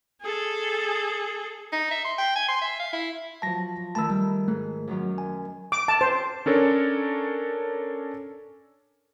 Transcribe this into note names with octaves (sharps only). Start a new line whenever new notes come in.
G#4 A4
D#4
E5
C6
G5
G#5
C6
E5
F5
E4
F3 F#3 A5 A#6
D#3 A3 A5 B5 E6
G3
G#2 A3
F#2 D#3 F#3
G#5
D6
A5
C5
C#4 D4 A4 A#4 C#5